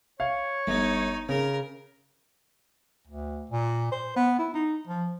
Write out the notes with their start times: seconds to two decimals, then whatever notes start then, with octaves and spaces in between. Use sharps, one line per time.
0.20 C#5 F5
0.67 G1 D#4
1.29 C#3 A#4
3.07 D2
3.50 A#2
3.92 C5
4.16 B3
4.39 E4
4.54 D#4
4.87 F3